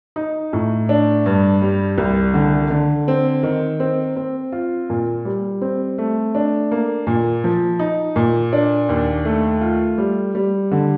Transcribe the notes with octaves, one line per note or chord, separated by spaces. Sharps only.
D#4
A2
D4
G2
G3
C2
D3
D3
C4
D#3
C4
C4
F4
A#2
G3
C4
A3
D4
A#3
A#2
F3
D#4
A#2
D4
D#2
A3
F4
G3
G3
D3